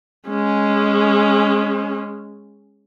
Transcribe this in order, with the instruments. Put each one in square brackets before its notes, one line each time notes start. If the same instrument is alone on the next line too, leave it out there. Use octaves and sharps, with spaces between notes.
[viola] G#3 C#4